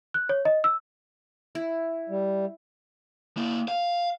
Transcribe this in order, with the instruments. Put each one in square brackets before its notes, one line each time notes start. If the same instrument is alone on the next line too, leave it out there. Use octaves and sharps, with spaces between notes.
[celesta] F#6
C#5
D#5
E6
[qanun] E4
[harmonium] G3
[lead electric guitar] A#3 E4
F5